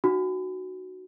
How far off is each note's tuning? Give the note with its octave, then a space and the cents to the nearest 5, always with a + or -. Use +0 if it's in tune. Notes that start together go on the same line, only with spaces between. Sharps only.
D#4 -30 F#4 +0